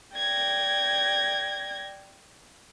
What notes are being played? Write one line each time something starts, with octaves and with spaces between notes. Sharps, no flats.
D5 G5 G#6 A#6